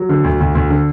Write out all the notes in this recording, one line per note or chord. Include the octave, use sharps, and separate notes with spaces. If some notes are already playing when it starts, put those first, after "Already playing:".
Already playing: F#3
D3
D2
D2
D2
D3